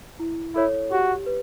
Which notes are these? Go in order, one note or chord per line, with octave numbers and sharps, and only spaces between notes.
E4
E4 A4 C#5
F#4 G4
B4